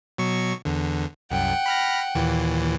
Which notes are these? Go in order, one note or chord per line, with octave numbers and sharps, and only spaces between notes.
B2 F#3 C#6
E2 D3
C2 F#2 F#5 G5
B5 F6 A#6
D#2 A#2 E3